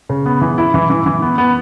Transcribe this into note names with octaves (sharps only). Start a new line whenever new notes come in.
C#3
B3
E3
E4
E3
E3
E3
B3
B3